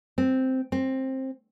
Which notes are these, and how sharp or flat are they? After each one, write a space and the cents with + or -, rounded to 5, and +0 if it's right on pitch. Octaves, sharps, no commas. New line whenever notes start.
C4 -5
C4 +15